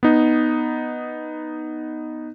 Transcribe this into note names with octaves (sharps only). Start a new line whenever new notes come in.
B3 D#4